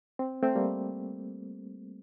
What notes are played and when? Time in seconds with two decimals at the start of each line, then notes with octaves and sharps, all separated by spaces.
0.19 C4
0.42 A3 C4
0.56 G3 A#3